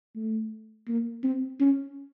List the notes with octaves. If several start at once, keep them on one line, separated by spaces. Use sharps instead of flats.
A3
A#3
C4
C#4